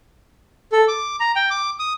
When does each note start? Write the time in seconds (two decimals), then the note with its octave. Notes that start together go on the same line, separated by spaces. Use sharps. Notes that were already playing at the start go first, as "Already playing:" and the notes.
0.72 A4
0.88 D6
1.20 A#5
1.36 G5
1.51 D6
1.79 D#6